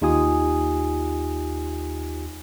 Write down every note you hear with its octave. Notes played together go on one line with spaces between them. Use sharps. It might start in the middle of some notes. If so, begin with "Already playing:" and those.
D#2 D#4 F4 G4 G#5 D#6